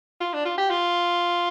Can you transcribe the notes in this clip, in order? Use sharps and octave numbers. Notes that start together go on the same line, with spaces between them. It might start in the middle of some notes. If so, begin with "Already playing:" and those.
F4
D4
F4
G4
F4